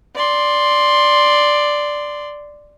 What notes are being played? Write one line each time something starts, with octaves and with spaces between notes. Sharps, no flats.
D5 C6